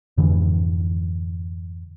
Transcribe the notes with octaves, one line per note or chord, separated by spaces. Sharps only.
F2 G#2 D3 E3